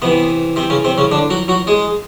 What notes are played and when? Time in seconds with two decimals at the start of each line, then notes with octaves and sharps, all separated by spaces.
0.02 C3 E3 B3
0.56 C3 C4
0.70 C#3 C#4
0.84 C3 C4
0.98 C#3 C#4
1.12 D3 D4
1.30 F#3 F#4
1.48 F#3 F#4
1.67 G#3 G#4